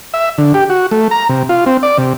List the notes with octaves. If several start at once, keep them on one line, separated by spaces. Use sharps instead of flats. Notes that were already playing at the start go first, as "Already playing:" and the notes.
E5
D3
G4
F#4
A3
A#5
C3
F4
C4
D5
C3